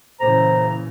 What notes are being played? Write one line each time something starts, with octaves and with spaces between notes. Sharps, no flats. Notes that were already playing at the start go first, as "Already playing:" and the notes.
A#2 C#3 E3 C5 A#5